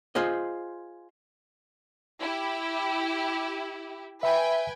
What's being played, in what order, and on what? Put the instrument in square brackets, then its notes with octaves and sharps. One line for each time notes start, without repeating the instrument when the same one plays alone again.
[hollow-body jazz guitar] F4 G#4 C5 D#5
[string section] E4 G4
[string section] B4 G5 G#5 [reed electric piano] E5 B5